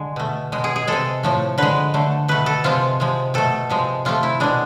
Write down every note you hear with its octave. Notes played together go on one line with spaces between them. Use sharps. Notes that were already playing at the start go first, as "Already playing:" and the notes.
Already playing: D3 G#3
B2 A3
B2 G#3
G#4
G#4
C3 G#3 A4
A2 F3 A3
D3 G#3 B4
D3 A3
B2 A3 B4
A4
C3 F3 G#3 F4
C3 F3 G#3
B2 A3 A4
C3 F3 G#3
C3 F3 A3 F4
E4
B2 G#3 D4